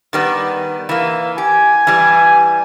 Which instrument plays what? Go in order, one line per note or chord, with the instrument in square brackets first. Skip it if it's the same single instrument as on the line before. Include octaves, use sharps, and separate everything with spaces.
[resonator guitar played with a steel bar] D#3 G3 B3
E3 A#3
[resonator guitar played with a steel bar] G4 [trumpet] G#5
[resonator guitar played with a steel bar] E3 G3